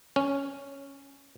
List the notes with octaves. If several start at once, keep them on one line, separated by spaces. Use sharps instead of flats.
C#4